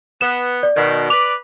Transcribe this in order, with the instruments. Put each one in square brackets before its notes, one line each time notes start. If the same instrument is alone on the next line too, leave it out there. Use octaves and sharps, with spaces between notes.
[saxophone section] B3 [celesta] E7
[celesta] D5
[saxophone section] B2 D#3
[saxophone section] B4 D5 [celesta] D6 F7